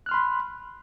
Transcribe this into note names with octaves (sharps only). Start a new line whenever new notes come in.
B5 C6 F6 F#6